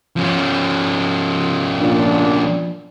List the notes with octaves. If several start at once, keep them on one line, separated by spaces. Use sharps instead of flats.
F3 C#4
A#2 D4